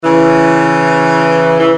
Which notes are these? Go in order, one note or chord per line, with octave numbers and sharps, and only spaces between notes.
C#3 E3
E3